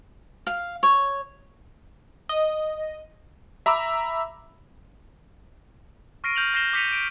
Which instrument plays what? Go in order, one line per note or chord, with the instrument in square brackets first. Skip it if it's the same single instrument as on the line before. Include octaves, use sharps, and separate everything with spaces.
[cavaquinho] F5
C#5
[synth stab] D#5
[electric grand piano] E5 A#5 B5 D6 E6
[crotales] C#6 F6 A#6 C7 D7 D#7
F6 G6 F7 F#7
F6 G6 A#6 C7 E7 G7
D6 G6 B6 C#7 D#7 F7
D7